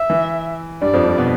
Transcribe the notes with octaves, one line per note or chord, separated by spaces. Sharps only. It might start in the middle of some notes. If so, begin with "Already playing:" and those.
Already playing: E5
E3
G2 G3 D5
F2 F3
G2 G3
B2 B3